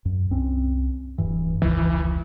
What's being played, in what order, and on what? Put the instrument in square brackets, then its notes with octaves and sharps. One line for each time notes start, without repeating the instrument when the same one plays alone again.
[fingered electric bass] F#2
C2 C4 C#4
D1 G2 E3
[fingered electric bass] F1 C#2 [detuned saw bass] E3